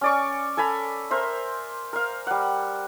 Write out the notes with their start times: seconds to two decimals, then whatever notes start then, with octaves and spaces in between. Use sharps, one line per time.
0.01 C#4 D5 C#6
0.57 A4 G#5 A#5 B5
1.11 A#4 C5 E5
1.93 A#4 F5
2.27 G3 F#5